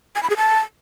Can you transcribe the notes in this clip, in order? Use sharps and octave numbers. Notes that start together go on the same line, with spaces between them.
G#5
B5
G#4
A5